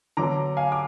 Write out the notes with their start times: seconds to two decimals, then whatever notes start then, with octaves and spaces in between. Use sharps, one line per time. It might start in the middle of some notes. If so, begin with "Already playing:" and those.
0.17 D3 F#3 B3 A#5 D6
0.57 F5 G#5
0.72 D6